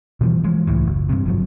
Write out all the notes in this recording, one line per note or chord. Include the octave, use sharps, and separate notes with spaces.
B2 E3 F3 G3
E3 F3 G#3
C#2 A2 E3
F#1
G2 C3
G1 F3 F#3